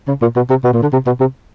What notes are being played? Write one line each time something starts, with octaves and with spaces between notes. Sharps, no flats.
C#3
A#2
B2
C3
B2
A#2
D3
C3
B2
C3